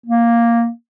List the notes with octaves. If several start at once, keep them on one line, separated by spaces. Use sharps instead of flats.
A#3